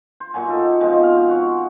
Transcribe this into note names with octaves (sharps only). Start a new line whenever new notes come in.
C5
A#2 F#3 G#5
D#4 A4
B2 F3 G#3 C4
F5
F#5 C#6